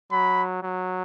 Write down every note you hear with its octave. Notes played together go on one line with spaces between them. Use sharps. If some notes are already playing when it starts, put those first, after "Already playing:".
F#3 B5
F#3